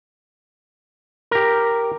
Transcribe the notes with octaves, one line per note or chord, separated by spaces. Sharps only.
G4 A#4